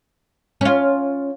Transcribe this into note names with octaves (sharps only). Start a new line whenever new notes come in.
C#4 F4